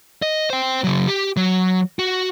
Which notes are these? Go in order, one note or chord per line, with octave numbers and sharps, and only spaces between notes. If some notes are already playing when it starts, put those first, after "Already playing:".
D#5
C5 G5
C#3 F#3
G4
F#3
F#4